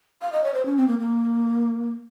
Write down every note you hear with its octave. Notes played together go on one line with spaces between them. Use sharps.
F5
D#5
C#5
C5
C#4
C4
A#3
A#3